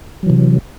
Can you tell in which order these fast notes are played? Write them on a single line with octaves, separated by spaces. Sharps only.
F#3 E3 C3